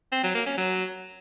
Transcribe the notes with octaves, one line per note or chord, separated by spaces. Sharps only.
C4
F#3
A#3
C#4
F#3